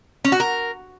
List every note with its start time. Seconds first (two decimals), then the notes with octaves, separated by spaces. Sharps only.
0.24 C#4
0.32 F#4
0.40 A#4